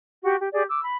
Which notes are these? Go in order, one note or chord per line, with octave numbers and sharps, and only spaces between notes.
F#4 G4 F#5
G4
G4 G#4 D5
D6 E6
B5